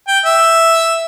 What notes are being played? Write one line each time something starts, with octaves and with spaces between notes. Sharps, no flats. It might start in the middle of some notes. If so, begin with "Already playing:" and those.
G5
E5